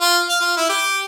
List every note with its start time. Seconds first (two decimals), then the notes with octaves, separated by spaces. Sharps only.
0.01 F4
0.29 F5
0.41 F4
0.57 E4
0.69 G4